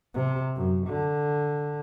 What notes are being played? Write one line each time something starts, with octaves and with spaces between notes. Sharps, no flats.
C3
F#2
D3